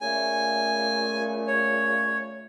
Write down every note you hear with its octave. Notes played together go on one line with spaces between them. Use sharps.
A#2 C#3 A3 G#5
C#5